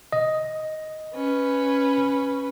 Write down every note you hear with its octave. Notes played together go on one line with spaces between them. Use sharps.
D#5
C#4 B4